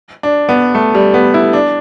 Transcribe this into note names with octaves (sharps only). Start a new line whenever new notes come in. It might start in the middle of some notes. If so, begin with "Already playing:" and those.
D4
B3
A3
G3
B3
E4
D4